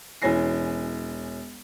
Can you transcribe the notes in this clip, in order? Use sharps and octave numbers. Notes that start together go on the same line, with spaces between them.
E1 E3 C#4 G#5 A#6 C7